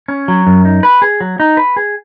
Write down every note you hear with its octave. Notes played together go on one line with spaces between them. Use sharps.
C#4
F#3
F#2
D#4
B4
G#4
F#3
D#4
B4
G#4